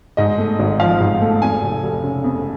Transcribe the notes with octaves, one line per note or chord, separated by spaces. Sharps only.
G#2 D#5
A3
G#1
F3 F5
G#2
A3
F2 G#5
F1
F1
C#3
F2